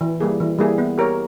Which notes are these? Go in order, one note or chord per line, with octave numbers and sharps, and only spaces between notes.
E3
G3 A#3 E4 G#4
E3
G3 A#3 E4 G#4
B3
G4 A#4 C#5